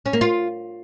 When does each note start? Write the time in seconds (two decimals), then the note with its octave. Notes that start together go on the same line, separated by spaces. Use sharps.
0.06 C#4
0.13 A#3
0.21 F4